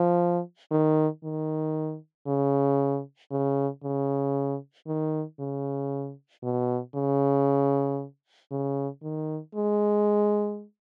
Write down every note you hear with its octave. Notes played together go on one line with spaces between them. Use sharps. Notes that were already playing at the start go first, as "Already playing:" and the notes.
Already playing: F3
D#3
D#3
C#3
C#3
C#3
D#3
C#3
B2
C#3
C#3
D#3
G#3